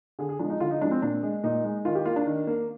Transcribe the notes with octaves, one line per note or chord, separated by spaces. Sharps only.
D3 G#4
G#4
F3 G#3 D4
D#4
D3 F4
D#4
F3 G#3 D4
C4
A#2 D4
G#3
A#2 D#4
G#3
D#3 F4
G4
A#3 F4
D4
D#3
A#3